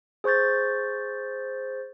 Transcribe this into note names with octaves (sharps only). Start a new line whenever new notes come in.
G#4 C5 C#6 G6 A6